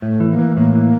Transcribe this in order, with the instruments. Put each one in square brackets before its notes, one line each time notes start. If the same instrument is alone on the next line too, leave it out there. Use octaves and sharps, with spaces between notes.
[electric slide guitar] A2 [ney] A3
[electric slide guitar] E3
[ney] A#3
[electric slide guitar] E3
[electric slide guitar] A2 [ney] A#3
[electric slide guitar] E3